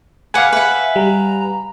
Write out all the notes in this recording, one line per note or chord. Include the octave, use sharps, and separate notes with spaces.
B4 F5 F#5 G#5 D6
B4 E5 F#5
G3 A#5